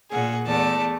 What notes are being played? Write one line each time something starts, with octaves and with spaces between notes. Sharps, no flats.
A#2 G#4 F#5
E2 A3 D5 A5